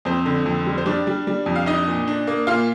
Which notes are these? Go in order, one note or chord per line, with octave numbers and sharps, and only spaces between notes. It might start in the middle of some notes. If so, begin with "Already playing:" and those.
F2 C4 C5
D3
F2
G3
C5
G3 D4 D5
G3
G3
F2
F5
D4 D#4 D#5
A#2
D4
A#3
A#2 F4 F5